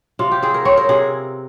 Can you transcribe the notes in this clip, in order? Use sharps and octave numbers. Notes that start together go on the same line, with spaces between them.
C3 F4
G4
C4 G#4
A#4
C4 C#5
A#4
C3 G#4